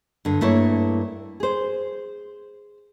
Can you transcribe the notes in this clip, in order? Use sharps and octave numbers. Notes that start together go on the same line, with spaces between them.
G2 D3
G2 A3 A#3 E4 C#5
G#4 C5